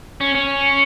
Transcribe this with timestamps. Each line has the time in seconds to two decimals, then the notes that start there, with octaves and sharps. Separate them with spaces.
0.21 C#4
0.35 C#4